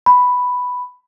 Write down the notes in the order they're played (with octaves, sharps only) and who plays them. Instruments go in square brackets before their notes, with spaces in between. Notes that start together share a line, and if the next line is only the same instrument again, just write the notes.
[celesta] B5